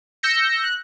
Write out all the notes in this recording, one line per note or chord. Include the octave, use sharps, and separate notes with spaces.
E6 G6 A#6 C#7
F#6